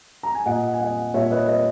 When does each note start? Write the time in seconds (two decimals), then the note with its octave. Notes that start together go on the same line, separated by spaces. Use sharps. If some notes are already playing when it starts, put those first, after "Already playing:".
0.23 A#5
0.35 G#5
0.46 A#2 D#5 F#5
0.73 G#5
0.79 D#5 F#5
1.14 A#2 C#5 E5
1.31 B4 D#5
1.48 B4 D#5